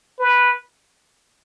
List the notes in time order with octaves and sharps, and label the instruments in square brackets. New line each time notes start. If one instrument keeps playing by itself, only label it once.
[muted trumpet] B4